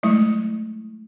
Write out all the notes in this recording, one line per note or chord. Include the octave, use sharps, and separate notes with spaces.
F#3 G#3 A3 E4